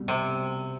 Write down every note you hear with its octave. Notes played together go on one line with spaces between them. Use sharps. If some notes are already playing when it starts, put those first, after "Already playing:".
Already playing: C2 B2 G3
C3